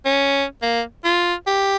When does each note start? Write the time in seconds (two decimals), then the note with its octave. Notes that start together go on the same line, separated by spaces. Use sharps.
0.05 C#4
0.62 A#3
1.05 F4
1.47 G4